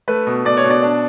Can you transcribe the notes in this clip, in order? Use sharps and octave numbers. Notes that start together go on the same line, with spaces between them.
A3 B4
B2
B2 D5
C#5
B2
D5
D4